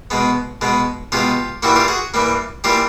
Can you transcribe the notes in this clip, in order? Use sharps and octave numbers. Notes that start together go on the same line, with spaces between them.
B2 G#3 B3
B2 G#3 B3
B2 G#3 B3 F4 G4
G2 E3 G3 A#3 E4 F#4
F4 G4
F#4 G#4
G2 E3 G3 A#3
E3 G3 A#3 F4 G4